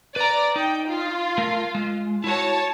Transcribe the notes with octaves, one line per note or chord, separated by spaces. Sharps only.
B4 D5 A#5
D#4 G5
F4
A3 A#4
G#3
E4 F#4 C#5 A5